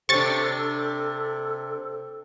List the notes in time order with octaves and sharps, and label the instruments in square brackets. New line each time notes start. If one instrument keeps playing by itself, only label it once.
[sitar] C3 D4 [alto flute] A4 [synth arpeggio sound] C#6 A6